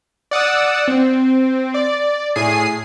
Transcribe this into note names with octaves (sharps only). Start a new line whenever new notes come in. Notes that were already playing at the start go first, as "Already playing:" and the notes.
D5 F#5 D#6 E6
C4
D5
A2 G#4 C7 D#7